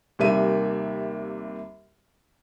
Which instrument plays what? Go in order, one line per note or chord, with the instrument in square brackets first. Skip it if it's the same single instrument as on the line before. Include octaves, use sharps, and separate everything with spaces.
[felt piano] D#2 C3 G3 A#3 E5 D#7